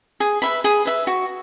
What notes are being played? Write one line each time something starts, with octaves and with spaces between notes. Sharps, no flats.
G#4
B4 E5 B5
G#4
B4 E5 B5
F#4